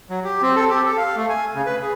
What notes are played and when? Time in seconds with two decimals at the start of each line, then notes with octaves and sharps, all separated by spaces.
0.10 F#3
0.24 G4
0.42 C4
0.56 A4
0.70 G4
0.86 A4
0.97 F5
1.17 A3
1.29 G#5
1.55 C#3
1.66 B4
1.82 G#4